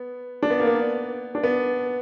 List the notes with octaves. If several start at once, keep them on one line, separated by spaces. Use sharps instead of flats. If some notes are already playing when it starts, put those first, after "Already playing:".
Already playing: B3
D4
B3
A#3
B3
D4
B3